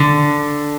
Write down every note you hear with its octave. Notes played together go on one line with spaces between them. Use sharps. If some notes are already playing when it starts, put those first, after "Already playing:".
Already playing: D3